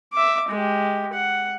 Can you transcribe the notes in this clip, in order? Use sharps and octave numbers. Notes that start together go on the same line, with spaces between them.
E5 D6
G#3 G4
F#5